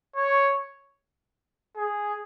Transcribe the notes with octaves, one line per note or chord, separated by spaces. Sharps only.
C#5
G#4